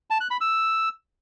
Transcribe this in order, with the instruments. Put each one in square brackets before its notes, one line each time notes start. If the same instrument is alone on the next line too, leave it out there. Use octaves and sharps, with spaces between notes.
[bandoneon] A5
F#6
B5
E6